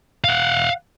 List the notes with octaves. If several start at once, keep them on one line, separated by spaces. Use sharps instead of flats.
F5 F#5